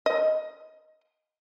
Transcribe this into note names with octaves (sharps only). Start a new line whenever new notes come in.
D#5